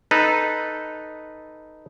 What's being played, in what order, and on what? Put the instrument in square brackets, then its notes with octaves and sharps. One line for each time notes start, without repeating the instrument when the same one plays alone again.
[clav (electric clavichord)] D#4 A4 B4